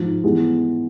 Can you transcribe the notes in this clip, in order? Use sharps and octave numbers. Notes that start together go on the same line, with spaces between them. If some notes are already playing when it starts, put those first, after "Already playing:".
Already playing: G#2 F3
E3 G#3 B3